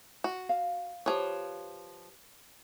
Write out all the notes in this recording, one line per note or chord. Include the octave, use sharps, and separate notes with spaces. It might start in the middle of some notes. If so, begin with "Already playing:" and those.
F#4
F5
F3 G4 B4 C#5